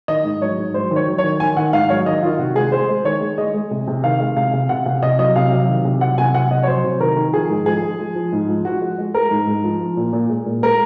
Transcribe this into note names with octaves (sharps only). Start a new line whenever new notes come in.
D#3 D#5
G#2
F#3 C#5
G#2
F#3 C5
D#3
C#5
F#3
C#5
D#3
D#3 G#5
D#3 F#5
G#2 F5
F#3 C#5
D#3 D#5
D#3 F4
C3 F#4
G#3 G#4
G#3 C5
G#3
D#3 C#5
G#3
G#3 D#5
G#3
C3
C3
D#3 F5
G#3
C3 F5
C3
C3 F#5
C3 F5
C3 D#5
F#3 D#5
C3 F5
F#3
D#3
C3
F#3 F#5
C3 G#5
F#3 F#5
C3 D#5
C#5
F#3 C5
C3
D#3 A#4
D#3
F3 G#4
G#2
F3 G#4
G#3
F3
F3
G#2
F3
F3 F#4
G#3
G#3
G#3 A#4
G#2
G#2
F3
F3
A#2
A#2
G#3
A#2
G#3 A#4